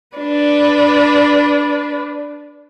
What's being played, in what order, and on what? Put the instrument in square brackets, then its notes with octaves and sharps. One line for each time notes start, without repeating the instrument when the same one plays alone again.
[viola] D4 B4